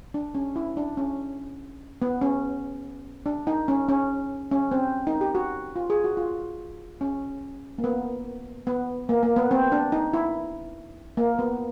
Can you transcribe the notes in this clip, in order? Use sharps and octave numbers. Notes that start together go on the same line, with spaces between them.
D4
C#4
E4
D4
C#4
B3
C#4
D4
D#4
C#4
C#4
C#4
C4
D#4
G4
F#4
F4
G#4
F#4
F4
C#4
A#3
B3
B3
A#3
A#3
B3
C4
D4
D#4
E4
A#3
B3